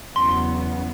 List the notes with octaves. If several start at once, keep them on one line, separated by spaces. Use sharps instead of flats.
E2 C#3 F#3 B3 C6